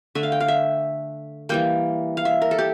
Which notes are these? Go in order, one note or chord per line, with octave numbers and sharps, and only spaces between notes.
D3 A3 E5
F5
G5
F5
E5
E3 G3 A#3 G5
F5
E5
A#4
A4
G4